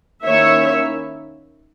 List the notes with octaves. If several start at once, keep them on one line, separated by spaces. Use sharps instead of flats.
D#3 A#3 C#4 E4 C#5 E5